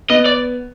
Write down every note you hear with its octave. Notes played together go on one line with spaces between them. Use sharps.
B3 D#5
D5